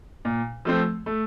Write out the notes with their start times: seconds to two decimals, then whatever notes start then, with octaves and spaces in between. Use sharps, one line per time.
0.25 A#2
0.65 F3 A3 C4
1.06 A3